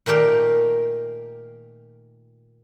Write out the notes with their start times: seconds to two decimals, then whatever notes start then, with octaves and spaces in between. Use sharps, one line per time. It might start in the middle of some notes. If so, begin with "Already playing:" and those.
0.06 A#2 D#3 A3 G4 A#4 C6